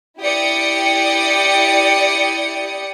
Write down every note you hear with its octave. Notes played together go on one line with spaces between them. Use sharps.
E4 G4 D5 G5 D#6 C#7